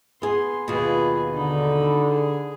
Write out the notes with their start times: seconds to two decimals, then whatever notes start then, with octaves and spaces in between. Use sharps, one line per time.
0.22 B3 G#4 C6
0.68 D#2 B2 F4 G#4 B4
1.35 D3 D#4 B5
2.10 G#4